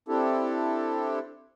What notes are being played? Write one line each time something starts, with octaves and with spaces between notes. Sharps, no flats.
C4 D4 E4 G4 A4